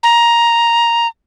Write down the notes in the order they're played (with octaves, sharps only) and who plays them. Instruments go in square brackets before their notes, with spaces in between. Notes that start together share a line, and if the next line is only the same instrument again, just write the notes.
[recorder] A#5